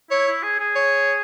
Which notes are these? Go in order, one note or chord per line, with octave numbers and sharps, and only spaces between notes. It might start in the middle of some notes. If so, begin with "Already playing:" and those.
E4 C#5
E4
G#4
G#4
C#5